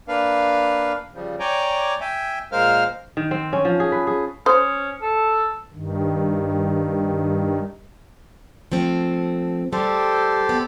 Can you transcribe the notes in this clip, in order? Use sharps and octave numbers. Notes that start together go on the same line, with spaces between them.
A#3 D4 B4 F5
C#3 F3 G3
C#5 D5 G5 G#5 A#5 D6
E5 G5 G#5
A#2 G#3 A#4 C5 F5 F6
D#3
C4
C#4
F3
G#4
B4
G#4
C#4 C5 D#6
A4
G2 D#3
F3 A3 C4
G3 G4 A4 C5
B3